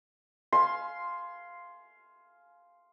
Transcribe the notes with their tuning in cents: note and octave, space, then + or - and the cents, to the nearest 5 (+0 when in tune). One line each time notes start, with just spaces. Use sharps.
F5 +0 G#5 +30 C6 +0